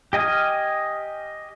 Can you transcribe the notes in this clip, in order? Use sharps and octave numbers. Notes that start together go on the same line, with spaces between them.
G4 D#5 G#5 D#6 F6